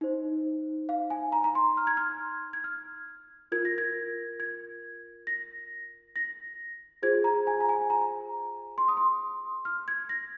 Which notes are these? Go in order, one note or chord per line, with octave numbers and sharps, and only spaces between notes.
D#4 C5
F5
G#5
A#5
A#5
C6
F6
G#6
F6
G#6
F6
F4 A#4 G#6
A#6
G#6
G#6
A#6
A#6
F4 G#4 C5 G#6
A#5
G#5
A#5
G#5
A#5
C6
D#6
C6
F6
G#6
A#6